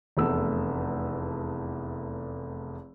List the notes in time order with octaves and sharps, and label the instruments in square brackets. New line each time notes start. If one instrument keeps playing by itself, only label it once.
[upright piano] F1 E2 A3 E6